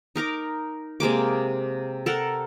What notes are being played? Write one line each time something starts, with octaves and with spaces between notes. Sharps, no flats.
D#4 A#4 A#5 D6
C3 G#3 A#3 D6
A4 A#4 F#5